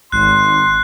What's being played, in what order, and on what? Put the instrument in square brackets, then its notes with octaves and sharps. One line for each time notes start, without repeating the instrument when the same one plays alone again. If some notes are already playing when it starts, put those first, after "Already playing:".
[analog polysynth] G#1 [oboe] C6 [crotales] F#6